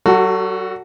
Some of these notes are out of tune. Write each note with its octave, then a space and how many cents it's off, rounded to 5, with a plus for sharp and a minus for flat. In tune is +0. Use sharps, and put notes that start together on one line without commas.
F#3 +45 F#4 +0 A4 +35